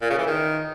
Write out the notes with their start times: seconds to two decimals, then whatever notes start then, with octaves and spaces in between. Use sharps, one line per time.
0.02 A#2
0.10 C#3
0.18 E3
0.27 D#3